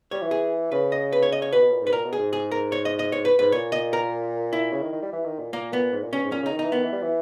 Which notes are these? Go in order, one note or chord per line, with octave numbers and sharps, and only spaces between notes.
G3 C#5
E3
G#4
C#3 B4
D#5
B4
C#5
D#5
C#5
B2 B4
B2
A#2
G#2
B4
A#2 A#4
B2
G#4
G#2
G#4
A#4
C#5
D#5
D#5
G#2 C#5
B4
G#2 B4
A#2 C#5
D#5
A#4
E4
C#3
D#3
D#3
G3
E3
D#3
A#2
A#2 A#3
B3
G#2
A#2
G2 C#4
G#2
A#2 C#4
C#3 D#4
D#3
E3 D#4
D#3 B3
E3
G3
E3